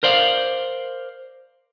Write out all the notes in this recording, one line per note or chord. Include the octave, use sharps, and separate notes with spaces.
A#4 C5 D5 F5